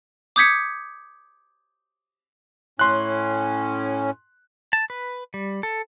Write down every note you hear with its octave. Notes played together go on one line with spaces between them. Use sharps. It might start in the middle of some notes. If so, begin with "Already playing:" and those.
D6 D#6 G6 G#6 B6 C#7
A2 C#4 C6 F#6
A5
B4
G3
A4